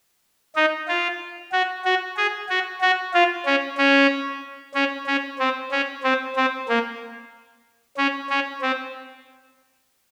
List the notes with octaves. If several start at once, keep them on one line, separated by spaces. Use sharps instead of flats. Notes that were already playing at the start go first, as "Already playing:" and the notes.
D#4
F4
F#4
F#4
G#4
F#4
F#4
F4
C#4
C#4
C#4
C#4
C4
C#4
C4
C4
A#3
C#4
C#4
C4